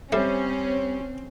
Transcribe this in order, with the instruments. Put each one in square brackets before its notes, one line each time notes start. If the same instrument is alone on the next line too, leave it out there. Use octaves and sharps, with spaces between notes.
[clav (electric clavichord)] G3 C5 [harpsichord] A3 [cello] C4 [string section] C#4